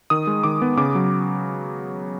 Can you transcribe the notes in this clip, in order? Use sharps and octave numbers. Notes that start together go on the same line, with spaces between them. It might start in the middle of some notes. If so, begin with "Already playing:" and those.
D#3 D#6
G#3
D#3 D6
B3
C#3 D6
F#3